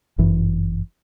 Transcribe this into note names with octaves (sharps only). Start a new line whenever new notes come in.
G1 F#2 E3